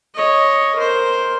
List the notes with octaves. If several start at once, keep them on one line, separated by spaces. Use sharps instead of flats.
C#5 D#5
A#4 C5